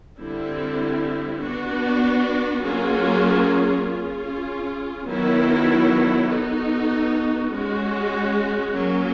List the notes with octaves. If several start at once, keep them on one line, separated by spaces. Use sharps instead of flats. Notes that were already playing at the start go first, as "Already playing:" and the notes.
D3 G3 C4 E4
B3 D4 F#4
F#3 A#3 C#4 F4 G#4
C#4 F4 G#4
D#3 F#3 B3 E4
B3 D#4 F#4 A4
G#3 C#4 F#4
F#3 A#3 C#4